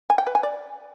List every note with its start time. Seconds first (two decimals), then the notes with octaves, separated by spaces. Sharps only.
0.10 G#5
0.18 G5
0.27 B4
0.35 G#5
0.43 D5